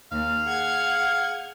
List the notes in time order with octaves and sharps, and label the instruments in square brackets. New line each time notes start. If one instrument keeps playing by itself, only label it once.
[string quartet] D#2 [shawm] F5
[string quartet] G#4 F#5 G#6